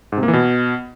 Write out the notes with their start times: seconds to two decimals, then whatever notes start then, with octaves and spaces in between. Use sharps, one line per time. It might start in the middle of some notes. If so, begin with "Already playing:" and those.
0.12 G#2
0.18 C3
0.23 A#3
0.28 E3
0.33 B2